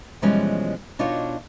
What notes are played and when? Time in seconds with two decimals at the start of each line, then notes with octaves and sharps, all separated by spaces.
0.22 B2 E3 F3 G3 G#3 C#4
0.99 B2 D4 D#4 F4 F#4 C#5